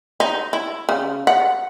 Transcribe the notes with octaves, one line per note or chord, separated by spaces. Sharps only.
D#4
E4
C#3
F#5